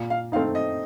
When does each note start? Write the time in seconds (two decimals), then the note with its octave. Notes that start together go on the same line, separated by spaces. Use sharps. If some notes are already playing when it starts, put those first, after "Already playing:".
Already playing: A#2
0.10 F5
0.32 A3 C4 D#4 F5
0.55 D#5